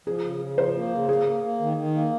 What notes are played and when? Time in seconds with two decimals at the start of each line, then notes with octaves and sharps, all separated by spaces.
0.06 F3 G#4
0.25 C#3
0.41 C#3
0.58 F3 C5
0.76 A#3
0.92 C#3
1.09 A#3 G#4
1.26 A#3
1.43 A#3
1.60 D#3
1.77 D#3
1.94 A#3